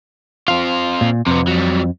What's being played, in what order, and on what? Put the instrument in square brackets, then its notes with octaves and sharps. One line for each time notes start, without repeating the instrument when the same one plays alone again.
[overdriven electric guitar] C4 F4 [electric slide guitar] F5
[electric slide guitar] A#2
[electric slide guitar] F2 [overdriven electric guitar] C3 B3
[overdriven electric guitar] F#3 G3